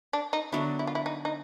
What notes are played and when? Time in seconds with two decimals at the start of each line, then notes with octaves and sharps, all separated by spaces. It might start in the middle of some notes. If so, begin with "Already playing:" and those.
0.13 D4
0.33 D#4
0.52 D3 F#3 B3 D4 E4
0.79 E4
0.87 F4
0.95 E4
1.06 D#4
1.25 D#4